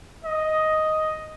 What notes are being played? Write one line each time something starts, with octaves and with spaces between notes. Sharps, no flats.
D#5